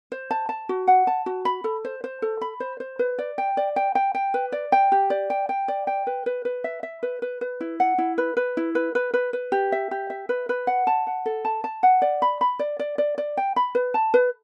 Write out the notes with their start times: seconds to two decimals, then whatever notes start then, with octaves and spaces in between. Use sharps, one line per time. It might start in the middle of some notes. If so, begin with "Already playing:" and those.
0.12 C5
0.31 A5
0.49 A5
0.69 F#4
0.87 F#5
1.07 A5
1.26 F#4
1.45 B5
1.64 A4
1.85 C5
2.04 C5
2.22 A4
2.41 B5
2.60 C5
2.80 C5
2.99 B4
3.19 D5
3.38 G5
3.57 D5
3.76 G5
3.95 G5
4.15 G5
4.34 B4
4.52 D5
4.72 G5
4.92 G4
5.10 D5
5.30 G5
5.49 G5
5.68 D5
5.87 G5
6.07 B4
6.26 B4
6.45 B4
6.64 E5
6.83 E5
7.03 B4
7.22 B4
7.41 B4
7.61 E4
7.80 F#5
7.98 E4
8.18 B4
8.37 B4
8.57 E4
8.75 B4
8.95 B4
9.14 B4
9.33 B4
9.52 G4
9.72 E5
9.91 G4
10.10 E5
10.29 B4
10.49 B4
10.67 F#5
10.87 A5
11.07 F#5
11.26 A4
11.45 A5
11.64 A5
11.83 F#5
12.02 D5
12.22 B5
12.41 B5
12.59 D5
12.79 D5
12.98 D5
13.18 D5
13.37 G5
13.56 B5
13.75 B4
13.94 A5
14.14 B4